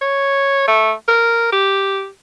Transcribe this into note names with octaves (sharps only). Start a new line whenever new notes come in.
C#5
A3
A#4
G4